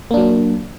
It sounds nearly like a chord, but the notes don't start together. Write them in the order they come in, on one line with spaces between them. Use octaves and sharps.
A#3 D4 F#3